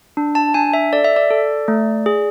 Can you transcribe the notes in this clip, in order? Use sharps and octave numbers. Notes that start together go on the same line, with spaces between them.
D4
A5
D4 G#5
E5
A4 D5
E5
D5
A4
A3
G#4